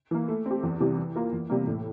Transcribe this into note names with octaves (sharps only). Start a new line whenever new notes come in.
E3 A#3
A3
C4 G4
E2
C3 E3 G3
E3
A#3 F4 A#4
E2
C3 G3 A#3
A2